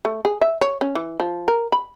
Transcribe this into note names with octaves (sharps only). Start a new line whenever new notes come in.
A3
G#4
E5
C#5
C#4
E3
F3
A#4
B5